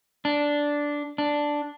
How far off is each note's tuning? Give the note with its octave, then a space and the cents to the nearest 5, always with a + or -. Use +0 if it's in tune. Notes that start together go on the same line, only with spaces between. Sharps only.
D4 -5
D4 +0